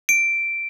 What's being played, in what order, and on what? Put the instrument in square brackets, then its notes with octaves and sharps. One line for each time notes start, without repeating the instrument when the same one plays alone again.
[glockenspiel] D7